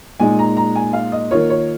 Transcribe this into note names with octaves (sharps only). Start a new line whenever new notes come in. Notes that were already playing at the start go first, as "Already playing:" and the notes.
A#2 G#3 D#4 G#5
A#5
A#5
G#5
F5
D#5
D#3 A#3 F4 C#5
C#5